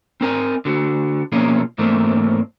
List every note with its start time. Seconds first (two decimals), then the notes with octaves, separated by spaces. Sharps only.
0.21 C4 A#4 G#5
0.65 D3 F#4
1.32 B2 F3 A#3 C#4 E4 G#4
1.78 G#2 E3 A3 A#3 C4 E4